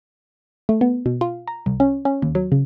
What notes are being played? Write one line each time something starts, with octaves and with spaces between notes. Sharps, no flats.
A3
B3
B2
F4
A#5
C2
C#4
C#4
D#2
F#3
C#3